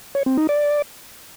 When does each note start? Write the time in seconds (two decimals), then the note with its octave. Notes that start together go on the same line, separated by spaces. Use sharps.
0.15 C#5
0.26 C4
0.38 D#4
0.49 D5